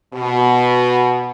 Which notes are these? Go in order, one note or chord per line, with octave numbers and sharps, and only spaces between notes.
B2